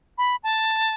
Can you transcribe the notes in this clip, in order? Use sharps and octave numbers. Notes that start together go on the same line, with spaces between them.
B5
A5